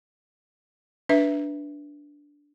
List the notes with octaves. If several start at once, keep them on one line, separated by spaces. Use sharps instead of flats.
D4 B4 E5